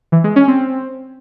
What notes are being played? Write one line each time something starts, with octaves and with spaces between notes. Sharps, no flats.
E3
G#3
C#4
C4